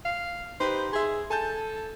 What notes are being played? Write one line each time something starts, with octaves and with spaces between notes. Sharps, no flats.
F5
D#4 G4 B4 C5
G#4 E5 C6
A4 G#5 A5 G6